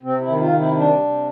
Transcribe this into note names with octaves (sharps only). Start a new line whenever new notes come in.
C3 C4
E4
D#3
F4
C3
E4
G3 D4
C3